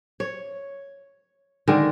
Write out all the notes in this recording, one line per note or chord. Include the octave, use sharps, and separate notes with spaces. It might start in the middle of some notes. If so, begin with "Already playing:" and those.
C#5
D3 D#3 G#3